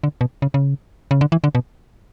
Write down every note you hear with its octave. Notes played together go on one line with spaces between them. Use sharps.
D3
B2
C#3
C#3
C#3
D3
E3
D3
B2